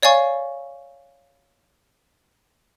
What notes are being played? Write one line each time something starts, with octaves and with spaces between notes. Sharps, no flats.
C#5 D5 F5 G#5 C#6